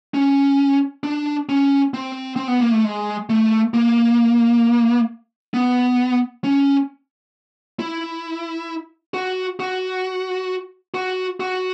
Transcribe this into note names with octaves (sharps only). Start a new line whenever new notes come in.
C#4
D4
C#4
C4
C4
B3
A#3
A3
G#3
A3
A#3
B3
C#4
E4
F#4
F#4
F#4
F#4